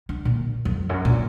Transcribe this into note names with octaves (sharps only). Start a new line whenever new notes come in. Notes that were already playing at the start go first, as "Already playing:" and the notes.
D3
A#2
F2
F#2
A#2